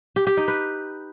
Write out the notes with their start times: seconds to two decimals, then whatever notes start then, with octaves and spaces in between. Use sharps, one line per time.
0.16 G4
0.27 G4
0.37 D#4
0.48 B4